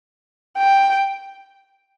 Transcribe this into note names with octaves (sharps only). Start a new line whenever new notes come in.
G5